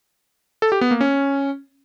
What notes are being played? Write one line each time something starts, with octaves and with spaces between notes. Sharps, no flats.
A4
G4
B3
A#3
C#4